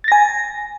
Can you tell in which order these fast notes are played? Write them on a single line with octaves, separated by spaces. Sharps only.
A6 A#6 G#5